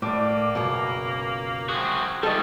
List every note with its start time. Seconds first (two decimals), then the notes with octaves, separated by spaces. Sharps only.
0.02 A2 A#3 D5 D6
0.55 C#2 F#2 B2
1.69 C4 F#4 G#4
2.23 G#2 G3 A3 A4 D#5